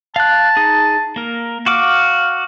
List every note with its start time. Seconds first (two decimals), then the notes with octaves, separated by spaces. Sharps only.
0.16 F5 A5 F#6
0.57 D#4 G#4
1.16 A#3 A#4
1.66 F#4 F5 D6